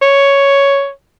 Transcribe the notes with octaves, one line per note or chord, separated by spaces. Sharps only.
C#5